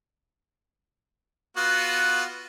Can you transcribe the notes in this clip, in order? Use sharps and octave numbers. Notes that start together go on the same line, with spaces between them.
B3 F4 F#4